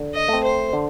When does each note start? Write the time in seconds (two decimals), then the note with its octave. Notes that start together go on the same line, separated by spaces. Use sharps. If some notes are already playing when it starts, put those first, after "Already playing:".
Already playing: D3
0.14 D#5
0.28 A3 C4
0.44 C5
0.73 D3